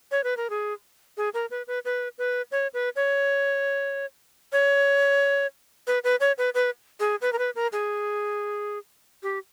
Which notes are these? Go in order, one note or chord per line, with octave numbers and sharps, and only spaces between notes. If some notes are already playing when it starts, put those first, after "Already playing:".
C#5
B4
A#4
G#4
G#4
A#4
B4
B4
B4
B4
C#5
B4
C#5
C#5
B4
B4
C#5
B4
B4
G#4
B4
A#4
B4
A#4
G#4
G4